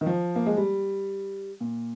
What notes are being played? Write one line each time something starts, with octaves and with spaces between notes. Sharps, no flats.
D#3
F3
A#3
G#3
G3
A#2